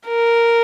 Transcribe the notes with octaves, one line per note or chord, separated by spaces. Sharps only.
A#4